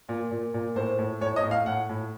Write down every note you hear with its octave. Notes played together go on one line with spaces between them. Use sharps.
A#2
A#2
A#2
A2 C5
A2
A2 C#5
D#5
A2
F5
A2 F#5
A2